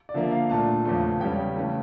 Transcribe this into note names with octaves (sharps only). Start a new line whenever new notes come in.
D5
D3 F3 A#3 E5
F5
A#2 A3 D4 A5
E2 C#3 F3 A3
E2 C#3 G3 C#4 G5
C#3 E3 A3